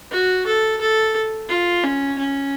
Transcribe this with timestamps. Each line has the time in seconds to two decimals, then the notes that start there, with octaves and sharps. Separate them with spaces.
0.12 F#4
0.46 A4
0.81 A4
1.49 F4
1.83 C#4
2.18 C#4